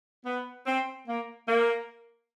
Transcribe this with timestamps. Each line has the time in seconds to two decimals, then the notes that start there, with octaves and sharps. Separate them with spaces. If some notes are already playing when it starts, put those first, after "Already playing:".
0.25 B3
0.66 C4
1.07 A#3
1.47 A#3